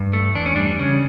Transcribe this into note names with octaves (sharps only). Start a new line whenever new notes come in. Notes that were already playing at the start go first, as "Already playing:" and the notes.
Already playing: G2
A3
E2 D4
C#4
G3 D4
C#3 C#4